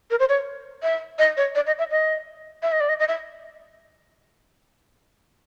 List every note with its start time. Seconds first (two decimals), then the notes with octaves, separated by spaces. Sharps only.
0.10 A#4
0.19 C5
0.29 C#5
0.83 E5
1.19 D#5
1.37 C#5
1.55 D5
1.67 D#5
1.79 E5
1.91 D#5
2.62 E5
2.72 D#5
2.80 D5
2.89 D#5
2.99 D#5
3.08 E5